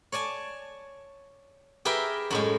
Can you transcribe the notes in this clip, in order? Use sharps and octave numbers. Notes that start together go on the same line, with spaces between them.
C#5 D5 G#5 A5
G4 G#4 A#4 B4 E5 G5
F#2 A2 G#3